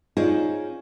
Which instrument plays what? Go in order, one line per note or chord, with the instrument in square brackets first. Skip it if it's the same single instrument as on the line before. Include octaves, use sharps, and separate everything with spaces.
[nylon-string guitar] C#4 D#4 F4 G#4 C5 D5